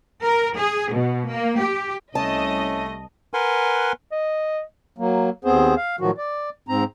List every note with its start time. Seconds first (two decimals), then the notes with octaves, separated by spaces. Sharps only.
0.22 A#4
0.57 G#4
0.93 B2
1.29 A#3
1.60 G4
2.15 C2 A3 C#4 D#5 A5
3.34 A#4 B4 F#5 G#5 C6
4.12 D#5
4.98 F#3 A#3
5.45 D#2 B3 C4 G#4 C5
5.77 F5
6.00 A2 D#3 F3 F#3 F#4
6.18 D5
6.69 G#2 C4 A#5